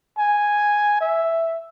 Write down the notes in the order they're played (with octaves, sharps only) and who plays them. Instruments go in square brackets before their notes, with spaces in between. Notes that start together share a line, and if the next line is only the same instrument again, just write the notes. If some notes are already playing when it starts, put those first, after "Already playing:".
[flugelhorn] G#5
E5